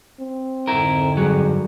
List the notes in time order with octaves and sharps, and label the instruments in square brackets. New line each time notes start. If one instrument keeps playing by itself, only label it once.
[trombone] C4
[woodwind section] F2 G#2 D3 [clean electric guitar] E4 A#4
[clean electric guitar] G2 F#3 [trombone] G#4